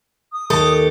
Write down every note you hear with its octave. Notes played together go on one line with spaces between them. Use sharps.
D#6
D#2 G4 A4 D#6